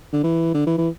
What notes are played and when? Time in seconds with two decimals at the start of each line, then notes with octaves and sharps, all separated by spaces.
0.13 D3
0.23 E3
0.54 D3
0.67 E3
0.78 E3